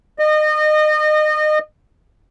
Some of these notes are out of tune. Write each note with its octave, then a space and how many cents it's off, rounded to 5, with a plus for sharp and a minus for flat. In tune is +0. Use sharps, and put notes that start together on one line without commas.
D#5 -30